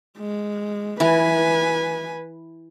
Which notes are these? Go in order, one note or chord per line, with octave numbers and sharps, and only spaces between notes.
G#3
E3 B4 G#5